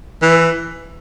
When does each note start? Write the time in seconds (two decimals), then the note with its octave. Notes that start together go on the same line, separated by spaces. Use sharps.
0.22 E3